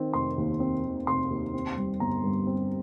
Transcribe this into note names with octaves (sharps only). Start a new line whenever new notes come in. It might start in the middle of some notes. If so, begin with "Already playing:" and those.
Already playing: D#3 C4
F1 C6
D#2
C4
D#3
F1 C6
D#2
C4
G3
G1 A#5
G2
C4